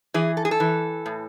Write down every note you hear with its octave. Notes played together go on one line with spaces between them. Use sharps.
E3 G#4
A4
G#4
A4
E3
A2